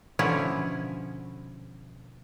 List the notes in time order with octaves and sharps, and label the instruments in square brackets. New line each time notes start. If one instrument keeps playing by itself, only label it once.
[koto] B2 D3 F3 C#4 E4